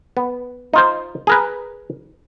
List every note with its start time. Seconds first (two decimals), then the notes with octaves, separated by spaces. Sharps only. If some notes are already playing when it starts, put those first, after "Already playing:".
0.17 B3
0.74 D#4 F4 C5
1.27 G#4 A#4 B4